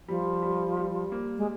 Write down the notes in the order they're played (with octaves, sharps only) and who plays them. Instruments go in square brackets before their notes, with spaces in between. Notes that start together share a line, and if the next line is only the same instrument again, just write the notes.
[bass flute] F3 [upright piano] G3
[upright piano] G3
G3
A#3
[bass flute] G#3